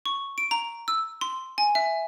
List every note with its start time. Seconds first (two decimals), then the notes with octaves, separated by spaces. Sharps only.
0.06 C#6
0.38 D7
0.51 A#5
0.88 E6
1.21 C6
1.58 G#5
1.75 E5